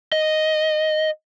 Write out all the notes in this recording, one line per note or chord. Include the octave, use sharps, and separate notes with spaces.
D#5